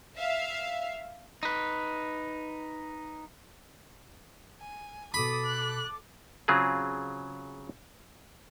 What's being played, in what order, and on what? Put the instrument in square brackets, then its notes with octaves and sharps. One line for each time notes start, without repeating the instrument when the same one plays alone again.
[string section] E5 F5
[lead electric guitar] D#4 B4
[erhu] G#5
[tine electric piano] B2 B6 [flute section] A4 D6 [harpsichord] B5 [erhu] D#6
[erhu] F#6
[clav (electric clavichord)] C#3 F#3 C4 F4 G#4